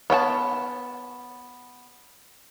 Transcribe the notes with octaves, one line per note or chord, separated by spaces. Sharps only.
B3 C#5 G5 A5